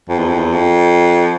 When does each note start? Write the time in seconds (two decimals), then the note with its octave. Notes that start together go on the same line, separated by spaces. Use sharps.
0.09 F2
0.19 E2
0.28 F2
0.39 E2
0.53 F2